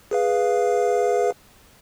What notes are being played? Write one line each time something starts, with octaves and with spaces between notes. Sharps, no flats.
G#4 B4 F5